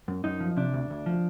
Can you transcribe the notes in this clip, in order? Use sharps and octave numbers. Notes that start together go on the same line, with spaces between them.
F#2
F#2 D#4
F3
C3 D4
D2
D2
F3